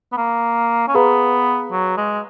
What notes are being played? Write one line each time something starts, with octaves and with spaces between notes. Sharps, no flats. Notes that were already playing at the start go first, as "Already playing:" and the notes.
B3
A#3
C#4
B3 G#4 B4 F5 A#5
F#3
G#3